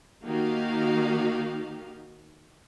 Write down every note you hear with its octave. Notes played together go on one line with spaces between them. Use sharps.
D#3 A#3 D#4 F#4 G4 F5